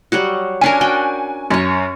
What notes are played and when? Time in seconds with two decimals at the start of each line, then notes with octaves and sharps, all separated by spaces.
0.12 F#3 G3 F#4
0.61 C#4 D4 A#4 G#5
0.81 F#4 G5
1.50 F#2 C#4 C#5